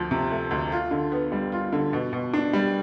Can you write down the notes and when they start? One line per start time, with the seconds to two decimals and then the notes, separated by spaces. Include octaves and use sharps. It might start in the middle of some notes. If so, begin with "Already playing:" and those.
Already playing: D2 F3
0.11 C3
0.31 A3
0.51 D2
0.72 F4
0.91 D3
1.12 B3
1.32 G3
1.52 F4
1.73 D3
1.93 B2
2.13 B2
2.34 D4
2.53 G3